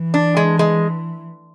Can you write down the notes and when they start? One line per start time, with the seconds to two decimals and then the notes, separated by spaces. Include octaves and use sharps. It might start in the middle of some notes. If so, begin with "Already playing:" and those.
Already playing: E3
0.14 D4
0.37 G#3
0.59 G#3